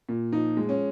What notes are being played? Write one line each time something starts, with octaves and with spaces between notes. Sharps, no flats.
A#2
F3 D#4
G#3
C#4